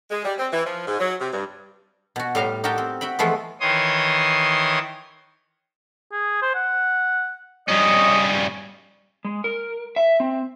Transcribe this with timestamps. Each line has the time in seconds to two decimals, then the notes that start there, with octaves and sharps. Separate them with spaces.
0.11 G#3
0.24 G3
0.38 C4
0.52 E3
0.66 F3
0.86 G#2
0.99 F#3
1.19 C3
1.32 G2
2.16 B2 F#4
2.35 A2 G3 F5 A#5 C6
2.64 D#4 F#4 G4 A#4 G5 A5
2.78 C4
3.01 F#4 E5 G5 B5
3.19 E3 F3 G#3 A3 B3 F4
3.60 D#3 E3 C#5 C6 D#6
6.12 G#4
6.42 C5
6.55 F#5
7.68 G2 C#4 D#5
9.25 G#3
9.44 A#4
9.96 E5
10.20 C4